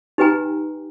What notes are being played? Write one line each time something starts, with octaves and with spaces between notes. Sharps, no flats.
D#4 G4 B4 G5 G#5 A#5